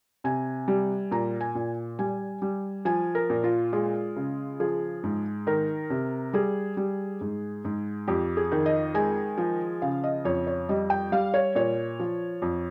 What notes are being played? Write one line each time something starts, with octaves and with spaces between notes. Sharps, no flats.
C3 G#5
G3
A#2 A#5
G#5
A#2
G3 G#5
G3
F3 G#5
A#4
A#2
F4
G#3 F4
C#3
F3 G#4
G#2
D#3 A#4
C3
G3 G#4
G3
G#2
G#2
F2 G4
G#4
D#3
D#5
G#3 G#5
F3
C#3 F5
D#5
F2 C#5
C#5
G3 D#5
G5
G3 F5
C#5
A#2 C#5
F3
F2